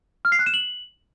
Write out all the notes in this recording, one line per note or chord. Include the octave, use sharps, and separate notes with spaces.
F6
C7
F#6
E7
F#7